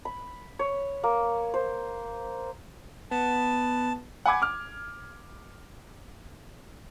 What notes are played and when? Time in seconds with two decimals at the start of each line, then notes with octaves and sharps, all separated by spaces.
0.05 B5
0.59 C#5
1.04 A#3
1.54 C5
3.11 B3 A5
4.26 F#5 G#5 B5 D6 G#6
4.42 D6 F6